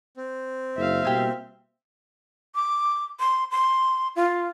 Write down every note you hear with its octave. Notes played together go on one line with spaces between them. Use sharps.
C4
F#1 E5 F5
B2 G3 A#3 E4 G4
D6
C6
C6
F4